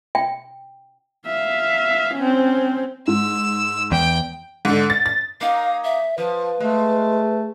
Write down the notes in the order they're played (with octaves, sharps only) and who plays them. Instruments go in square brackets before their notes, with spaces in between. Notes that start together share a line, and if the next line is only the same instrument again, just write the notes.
[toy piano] G5
[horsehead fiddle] E5 F5
C4 C#4
[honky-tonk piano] G#2 [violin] E6
[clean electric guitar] E2 [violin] G5
[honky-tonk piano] G#2 D3
A6
A6
[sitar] A#3 D#4 [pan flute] F5
[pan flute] E5
[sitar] F3 [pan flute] B4
[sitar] G#3 [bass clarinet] A3